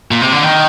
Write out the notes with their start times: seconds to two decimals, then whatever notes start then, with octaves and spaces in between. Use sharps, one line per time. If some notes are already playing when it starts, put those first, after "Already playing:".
0.11 A#2
0.22 C3
0.32 D3
0.43 D#3